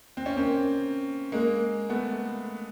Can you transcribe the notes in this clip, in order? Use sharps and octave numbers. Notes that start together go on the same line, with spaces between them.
C4
C#4
A#3 C4
G#3 A#3
A3 B3